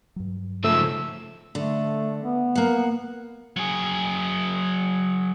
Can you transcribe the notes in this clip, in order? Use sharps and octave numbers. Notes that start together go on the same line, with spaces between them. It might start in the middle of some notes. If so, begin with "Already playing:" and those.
G2 F#3
C#3 F3 A3 E6
D3 A3
B3
A#3 F#5
F#3 G#4